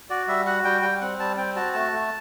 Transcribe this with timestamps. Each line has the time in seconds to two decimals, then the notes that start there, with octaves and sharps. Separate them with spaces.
0.10 F#4 D5
0.27 G3 E5
0.46 F#4 F#5
0.65 G3 G5
0.82 G3 G5
1.01 C4 F#5
1.19 G3 A5
1.37 C4 G5
1.56 F#4 A5
1.74 A3 A5
1.92 A3